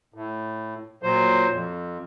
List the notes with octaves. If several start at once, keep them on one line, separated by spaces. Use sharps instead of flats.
A2
A#2 F#3 C5
F2